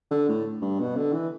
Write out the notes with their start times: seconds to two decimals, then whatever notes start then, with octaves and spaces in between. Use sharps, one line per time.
0.11 D3
0.29 A2
0.62 G2
0.80 B2
0.97 D3
1.13 E3